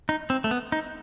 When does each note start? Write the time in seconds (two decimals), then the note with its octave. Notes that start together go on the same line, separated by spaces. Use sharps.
0.09 D#4
0.30 C4
0.44 A3
0.51 B3
0.72 D#4